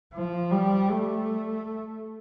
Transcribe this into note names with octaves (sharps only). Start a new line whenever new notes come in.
F3
G3
A3